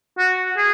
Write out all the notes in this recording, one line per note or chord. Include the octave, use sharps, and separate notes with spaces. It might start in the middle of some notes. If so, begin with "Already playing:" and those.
F#4
G#4